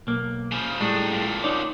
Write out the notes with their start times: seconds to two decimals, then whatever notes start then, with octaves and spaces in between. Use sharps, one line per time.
0.07 B1 A#3
0.52 C#3 F3
0.81 A2 G3 G#3 D4 D#4
1.12 F2 A#2
1.44 D#4 C#5 D5